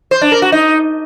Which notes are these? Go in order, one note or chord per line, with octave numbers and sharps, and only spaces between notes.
C5
D4
A#4
F#4
D#4